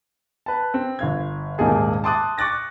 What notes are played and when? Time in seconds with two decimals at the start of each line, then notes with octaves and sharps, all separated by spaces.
0.46 B4 A5
0.74 C4
0.99 G1 F5 G#6
1.58 D#1 G#2 A#3 D#4 G#4 A5
2.04 A5 C6 D6 D#6 F#6 A6
2.38 C#6 D6 F#6 A6 A#6